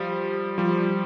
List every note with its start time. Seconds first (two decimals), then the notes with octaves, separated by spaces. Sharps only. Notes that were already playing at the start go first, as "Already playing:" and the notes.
Already playing: F3 G3
0.58 F3 G3